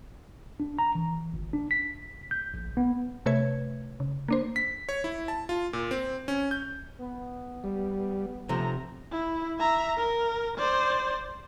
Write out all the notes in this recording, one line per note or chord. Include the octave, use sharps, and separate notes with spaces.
D4
A#5
E3
G1
D4
B6
G6
A#1
B3
C3 A3 B4 C#5 E5 G#6
C#3
A#3 D4 C5
B6
C#5
E4
A5
F4
A#2
C4
C#4
G6
B3
G3
C3 F3 A3 A#5
E4
E5 A#5
A#4
C5 D5